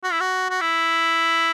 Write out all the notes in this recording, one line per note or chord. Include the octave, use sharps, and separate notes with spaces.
F#4
E4
F#4
F#4
E4